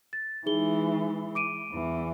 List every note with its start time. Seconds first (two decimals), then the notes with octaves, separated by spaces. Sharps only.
0.13 A6
0.46 E3 G#3 D#4 G#4 G7
1.35 D6 D7 D#7
1.71 E2 E3